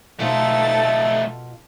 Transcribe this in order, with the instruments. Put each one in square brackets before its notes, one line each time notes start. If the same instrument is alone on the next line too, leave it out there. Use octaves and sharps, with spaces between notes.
[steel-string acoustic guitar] B2 F4 [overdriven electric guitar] A3 D#4 [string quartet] A4 A6